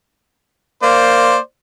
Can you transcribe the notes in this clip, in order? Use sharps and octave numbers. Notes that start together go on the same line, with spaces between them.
A#3 C5 D5